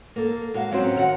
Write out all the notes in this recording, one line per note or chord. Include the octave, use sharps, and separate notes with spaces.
A#3 A4
G#3 F#4 F5
G#2 F#3 C4 C#4 F#4 C5
D#3 F5 F#5